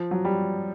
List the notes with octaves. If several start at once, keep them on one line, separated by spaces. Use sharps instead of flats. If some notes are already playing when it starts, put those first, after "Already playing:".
Already playing: F3
F#3
G3